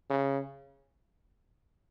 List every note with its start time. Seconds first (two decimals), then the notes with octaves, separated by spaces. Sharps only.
0.10 C#3